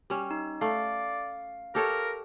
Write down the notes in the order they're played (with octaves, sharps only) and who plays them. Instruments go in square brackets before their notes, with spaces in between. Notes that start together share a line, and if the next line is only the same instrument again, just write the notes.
[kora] G3 C#4
[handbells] D#4
[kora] A3 [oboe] D5 [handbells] F5
[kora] G4 A4 C#5 [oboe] A#4